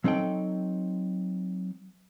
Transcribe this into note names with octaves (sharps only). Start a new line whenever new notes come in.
F#3 C4 D#4 A4 G5